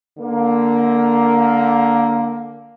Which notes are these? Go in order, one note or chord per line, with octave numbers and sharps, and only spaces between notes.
D3 A#3